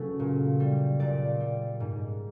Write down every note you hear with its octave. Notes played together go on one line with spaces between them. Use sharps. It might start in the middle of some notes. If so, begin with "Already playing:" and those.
Already playing: C#3 F#3 A3 B4
A#2
G3
A#2 D5
G3
G#2